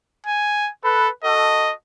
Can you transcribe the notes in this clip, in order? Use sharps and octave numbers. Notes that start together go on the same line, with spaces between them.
G#5
A4 B4
F#4 A4 D#5